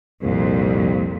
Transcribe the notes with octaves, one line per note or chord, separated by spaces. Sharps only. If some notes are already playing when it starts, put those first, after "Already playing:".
C2 F2 A#2